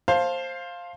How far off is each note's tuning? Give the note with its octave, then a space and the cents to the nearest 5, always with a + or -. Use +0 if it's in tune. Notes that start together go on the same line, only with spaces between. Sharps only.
C5 +15 F5 +0 A5 +0